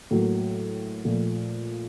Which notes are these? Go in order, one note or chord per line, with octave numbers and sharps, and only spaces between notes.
A2 F#3 A#3
A#2 F3 A3